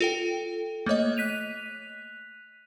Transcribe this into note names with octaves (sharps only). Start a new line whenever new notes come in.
F4 A4 G5
A3 A#3 C#5 D#5
F#6 B6 D#7 F7